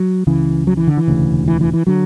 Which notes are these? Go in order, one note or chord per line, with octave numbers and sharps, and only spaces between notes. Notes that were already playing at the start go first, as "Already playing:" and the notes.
Already playing: F#3
C#2 C#3 E3
F#3
E3
D3
E3
E1 D2 C#3
E3
E3
E3
D3 F#3